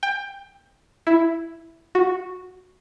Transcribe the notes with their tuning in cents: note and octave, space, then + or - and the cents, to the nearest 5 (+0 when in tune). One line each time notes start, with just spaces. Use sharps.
G5 +20
E4 +5
F#4 -5